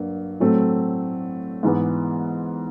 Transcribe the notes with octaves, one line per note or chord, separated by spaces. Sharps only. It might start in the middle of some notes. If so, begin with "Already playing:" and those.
Already playing: G2 F#3 A#3
A2 F#3 A3 C4
G#2 E3 G#3 B3